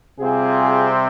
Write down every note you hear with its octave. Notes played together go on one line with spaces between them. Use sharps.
C3 G3 C4 F4 G#4